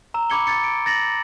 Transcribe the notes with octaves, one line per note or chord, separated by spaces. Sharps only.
A#5 E6 E7
B5 D6 G#6 C#7 G7
G#6 A6 C#7
D7
A6 A#6 E7 F#7